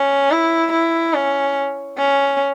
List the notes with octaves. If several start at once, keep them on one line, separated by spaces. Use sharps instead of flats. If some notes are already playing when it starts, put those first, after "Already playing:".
Already playing: C#4
E4
E4
C#4
C#4